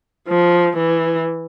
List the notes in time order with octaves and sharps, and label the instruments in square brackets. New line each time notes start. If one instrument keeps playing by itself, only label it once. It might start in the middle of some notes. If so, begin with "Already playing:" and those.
[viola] F3
E3